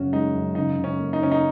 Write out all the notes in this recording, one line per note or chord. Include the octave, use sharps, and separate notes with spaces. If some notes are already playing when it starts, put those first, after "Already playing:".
Already playing: F#2 C#3 C#4 F#4
G#3 D#4
F#2
C#3 D#4
C#3
C#4
A#3
D#4
C#3 C#4
D#4